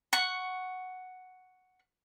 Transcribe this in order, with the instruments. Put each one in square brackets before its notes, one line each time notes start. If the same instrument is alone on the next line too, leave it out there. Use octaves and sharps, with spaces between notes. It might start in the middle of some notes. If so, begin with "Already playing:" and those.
[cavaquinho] F#5 C#6